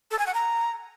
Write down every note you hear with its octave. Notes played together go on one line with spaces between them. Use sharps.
A4
G#5
F#5
A#5